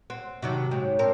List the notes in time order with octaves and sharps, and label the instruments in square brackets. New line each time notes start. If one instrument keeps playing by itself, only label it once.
[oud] C4 [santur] F#5
[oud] C3 D#3 F#3 [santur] F#4 A5
[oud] G#2 [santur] C#5 G5
[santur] C4 D4 C5 [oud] A#4